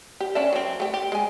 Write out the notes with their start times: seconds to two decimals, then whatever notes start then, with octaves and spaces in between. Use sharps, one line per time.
0.20 G4
0.35 C#4 D4 E5
0.53 F#3 C4
0.80 A3 G4
0.94 G4
1.12 G#3 G#5